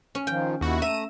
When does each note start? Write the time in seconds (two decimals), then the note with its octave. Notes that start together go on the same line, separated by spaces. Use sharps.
0.15 C#4
0.27 D#3 F3 G5
0.61 D#2 E4 F#4
0.82 A3 E5 A#5 D#7